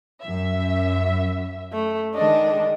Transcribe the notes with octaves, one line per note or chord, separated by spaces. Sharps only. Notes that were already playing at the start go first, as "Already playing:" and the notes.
F#2 E5
A3
D#3 G#3 D4 D#5